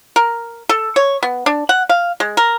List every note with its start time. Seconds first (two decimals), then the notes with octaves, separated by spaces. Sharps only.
0.16 A#4
0.69 A4
0.96 C#5
1.23 B3
1.46 D4
1.69 F#5
1.89 F5
2.20 G#3
2.37 A#4